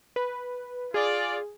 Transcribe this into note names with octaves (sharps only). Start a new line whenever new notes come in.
B4
F4 G#4 D5